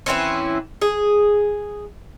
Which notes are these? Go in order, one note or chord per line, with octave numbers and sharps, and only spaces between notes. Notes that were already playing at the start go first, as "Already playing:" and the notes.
E3 C4 C#4 E4
G#4